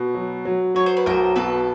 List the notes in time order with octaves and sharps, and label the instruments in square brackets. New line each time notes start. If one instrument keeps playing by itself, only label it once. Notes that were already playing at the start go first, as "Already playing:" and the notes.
Already playing: [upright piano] B2 [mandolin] B4
[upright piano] F#3
F#3
[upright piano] F#3 [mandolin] C#5
[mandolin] C5
B4
[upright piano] B1 [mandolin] A#4 C5
[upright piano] B2 [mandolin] A4 B4